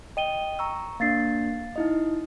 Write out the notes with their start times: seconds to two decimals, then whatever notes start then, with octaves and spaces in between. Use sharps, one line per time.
0.17 D#5 G5 D#7 G7
0.59 A#5 C#6 E6
1.00 A#3 D4 F5 A6 C7
1.76 D#4 E4 D#5